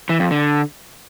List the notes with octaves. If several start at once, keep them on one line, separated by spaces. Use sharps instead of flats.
E3
F2
D3